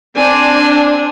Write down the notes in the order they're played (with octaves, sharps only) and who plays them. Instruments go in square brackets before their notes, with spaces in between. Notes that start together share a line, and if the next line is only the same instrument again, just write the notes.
[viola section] C4 D4 [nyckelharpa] G#5